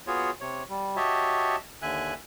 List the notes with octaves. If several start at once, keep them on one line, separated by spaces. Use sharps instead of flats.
B3 F4 F#4 G#4 C#5
C3 C#5
G3
F#4 G4 C#5 D#5 E5 A5
D#2 D3 E5 G#5 F#6